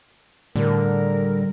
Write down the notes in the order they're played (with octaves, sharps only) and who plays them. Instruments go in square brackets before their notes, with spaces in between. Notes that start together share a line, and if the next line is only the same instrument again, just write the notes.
[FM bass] A2 [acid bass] D3 [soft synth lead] G3 [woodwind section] A#4